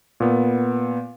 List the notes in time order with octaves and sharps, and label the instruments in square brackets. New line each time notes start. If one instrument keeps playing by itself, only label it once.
[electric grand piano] A#2 B3